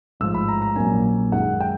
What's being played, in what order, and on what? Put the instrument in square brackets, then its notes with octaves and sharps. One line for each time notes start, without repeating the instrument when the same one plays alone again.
[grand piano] A1 G#2 F3 E6
B5
A#5
A#5
A#1 A#2 F#3 A#3 C#4 G#5
F#2 D#3 G#3 F#5
G5